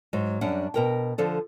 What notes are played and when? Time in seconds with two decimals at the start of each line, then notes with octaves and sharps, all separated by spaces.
0.13 G#2 F#3
0.41 F#2 G3 D4 F#5
0.74 B2 A#4 G5
1.18 D3 F3 A4 D5